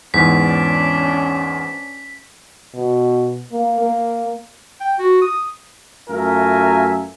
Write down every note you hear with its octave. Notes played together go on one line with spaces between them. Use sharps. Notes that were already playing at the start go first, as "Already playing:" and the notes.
E2 G#2 C#4 D4 B6
B2
A#3
A#3
G5
F#4
D#6
F#2 A3 F4 A#4 E5 G#5